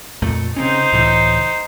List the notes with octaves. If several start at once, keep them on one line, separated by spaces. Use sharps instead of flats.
F2 A#2 A3
C#3 C4 C#4 D#4 C5
C#2 A2 E3